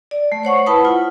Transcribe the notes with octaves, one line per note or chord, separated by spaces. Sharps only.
D5
A3
C5 C#5 F#5 C#6
E4 B4 F#5 A5 B5 D#6
F4